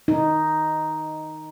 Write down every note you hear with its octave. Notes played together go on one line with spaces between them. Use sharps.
D#4